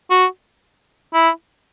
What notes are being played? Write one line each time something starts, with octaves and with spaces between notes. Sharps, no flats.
F#4
E4